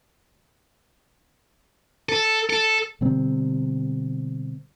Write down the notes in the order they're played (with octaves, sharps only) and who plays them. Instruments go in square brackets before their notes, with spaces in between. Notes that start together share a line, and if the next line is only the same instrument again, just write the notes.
[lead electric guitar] A4
A4
[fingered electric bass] B2 D3 G3 C4